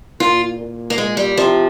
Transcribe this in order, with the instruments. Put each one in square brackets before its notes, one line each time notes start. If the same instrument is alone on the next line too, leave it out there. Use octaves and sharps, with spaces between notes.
[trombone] A#2 [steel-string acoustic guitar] F4
[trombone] A#2
[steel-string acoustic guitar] A#3
G#3
G3
[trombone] C3 [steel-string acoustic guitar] F3